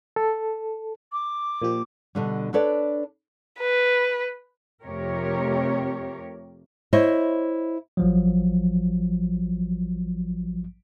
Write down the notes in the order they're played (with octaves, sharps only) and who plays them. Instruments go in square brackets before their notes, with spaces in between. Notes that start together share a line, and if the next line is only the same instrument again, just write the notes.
[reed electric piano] A4
[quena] D6
[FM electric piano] A#2 F3 G4
[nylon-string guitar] B2 D3 G3
D4 A4 B4 C#5 D5
[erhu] B4
[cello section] F2 C3 A3 G4 A#4 C#5
[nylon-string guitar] E4 C5 C#5 D#5 E5
[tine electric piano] A1 F3 F#3